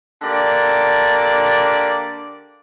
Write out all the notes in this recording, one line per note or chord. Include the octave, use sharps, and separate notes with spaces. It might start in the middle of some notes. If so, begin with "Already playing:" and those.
D3 A#3 G4 D5